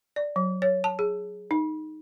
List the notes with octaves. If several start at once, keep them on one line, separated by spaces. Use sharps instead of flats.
D5
F#3
C#5
A5
G#4
D#4